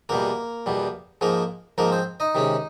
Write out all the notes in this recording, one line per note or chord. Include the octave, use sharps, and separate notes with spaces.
E2 B2 G3 A#3 A#4
E2 B2 G3
G#2 F3 G#3 A#3 A#4
G#2 F3 G#3 A#3 A#4
C4 C5
D#4 D#5
C3 D#3 G#3 C#4